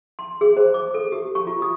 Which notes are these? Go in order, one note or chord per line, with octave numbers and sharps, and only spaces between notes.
C6
G#4
C5
D6
A4
G4
C#6
F4
D#6